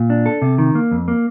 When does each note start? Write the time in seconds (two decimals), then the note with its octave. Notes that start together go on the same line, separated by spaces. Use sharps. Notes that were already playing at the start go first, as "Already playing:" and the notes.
Already playing: A#2
0.10 D4
0.26 A4
0.42 C3
0.58 D#3
0.75 A#3
0.91 F2
1.08 A#3